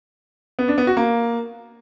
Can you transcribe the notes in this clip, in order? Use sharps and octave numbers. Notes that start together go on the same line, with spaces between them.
B3
D4
B3
F#4
A#3